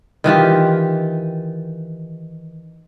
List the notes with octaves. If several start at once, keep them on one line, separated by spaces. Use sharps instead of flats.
D#3 E3 F4 G4